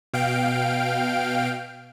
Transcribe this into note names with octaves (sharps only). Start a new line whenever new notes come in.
B2 F5 G5 D7